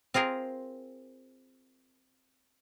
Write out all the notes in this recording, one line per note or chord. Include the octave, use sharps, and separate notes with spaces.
C4 F4 G#4 A#4